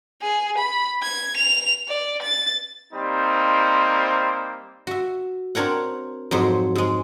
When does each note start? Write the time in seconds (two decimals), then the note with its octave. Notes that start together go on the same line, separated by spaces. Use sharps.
0.22 G#4
0.58 B5
1.03 G#6
1.37 F7
1.88 D5
2.22 A6
2.93 G3 A#3 C4 D#4 C5
4.87 F#4 E5
5.55 C4 D4 A#4 C#5 F#5
6.31 F2 G#2 F#3 C5
6.75 G#2 G#3